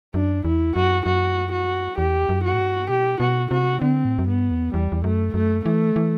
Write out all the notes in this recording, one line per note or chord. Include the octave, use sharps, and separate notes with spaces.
F#2 D4
E2 E4
F#2 F#4
F#2 F#4
F#4
E2 G4
F#2
F#4
A2
G2
B2 G4
B2 F#4
C3 F#4
D3 C4
A2
F#2
G2 B3
E2
E2 G3
E2
F#2 A3
F#2 A3
E3 A3
E3